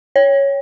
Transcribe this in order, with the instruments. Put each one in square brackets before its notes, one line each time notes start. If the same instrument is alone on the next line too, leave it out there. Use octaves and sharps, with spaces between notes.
[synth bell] C#5